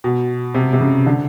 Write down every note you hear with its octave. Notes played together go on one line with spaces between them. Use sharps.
B2
C3
C3
C#3
D3